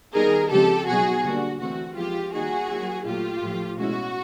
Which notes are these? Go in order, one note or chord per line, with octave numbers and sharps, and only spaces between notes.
D#3 G3 B3 D#4 G#4 A#4
C#3 F3 G#3 C4 G4 A4
B2 F#3 B3 D#4 F#4 G#4
D3 G3 A#3 D4 F#4
C3 E3 A3 C4 F#4
F3 G#3 B3 E4 F4 G4
D#3 G3 A#3 D#4 F#4 G#4
F#3 A#3 C#4 E4
A#2 F#3 A3 F4 G4
A2 F3 A3
B2 G#3 C#4 E4 F#4